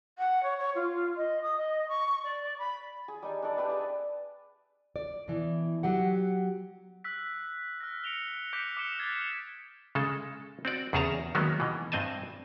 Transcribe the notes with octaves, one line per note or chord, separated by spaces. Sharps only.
F#5
C#5
C#5
F4
D#5
D#6
D#5
C#6
D5
B5
G#4
G3 D#4 G#5 A5
D4 A4 D5
D4 G4 B4 E5
G#4 A5
D5
B2 E3
F#3 G4 F#5
E6 F#6 B6
F6 F#6 A#6
C#7 D7 F7 G7
D6 F#6 G6 B6 C#7 D7
D6 D#6 F6 C#7 E7 G7
F6 F#6 G#6 A6 C7 G7
C#3 G#3 A4 A5
C4 F#4 D5
E2 C#3 G#4 C#5 A5 A#5
D#3 F#3 G#3 A#3 B3 C#4
B2 E3
G2 C4 D#5 G#5 A5